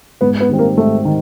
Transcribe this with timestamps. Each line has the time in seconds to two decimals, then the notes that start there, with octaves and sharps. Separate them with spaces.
0.21 G#2 B3
0.40 B3
0.49 D#3 G3 C4
0.59 A#3
0.77 G#2 A3
1.05 D#3